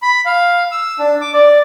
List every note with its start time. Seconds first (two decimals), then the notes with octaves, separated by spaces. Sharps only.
0.02 B5
0.26 F5
0.72 E6
0.99 D4
1.21 D6
1.33 D5